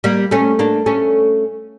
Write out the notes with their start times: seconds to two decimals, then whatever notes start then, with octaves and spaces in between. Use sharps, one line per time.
0.04 G3 A#3
0.31 A3 C#4
0.59 A#3 D4
0.86 A3 C#4